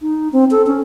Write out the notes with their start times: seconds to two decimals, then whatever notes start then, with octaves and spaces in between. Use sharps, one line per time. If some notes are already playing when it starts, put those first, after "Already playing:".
0.01 D#4
0.33 C4
0.51 A4
0.66 C#4